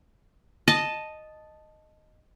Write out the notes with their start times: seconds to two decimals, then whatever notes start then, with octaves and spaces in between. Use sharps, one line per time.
0.68 D#5 A5